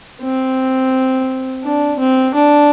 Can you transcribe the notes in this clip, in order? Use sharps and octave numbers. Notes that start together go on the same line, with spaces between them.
C4
D4
C4
D4